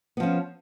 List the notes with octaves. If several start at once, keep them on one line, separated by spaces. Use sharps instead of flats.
F3 B3 C#4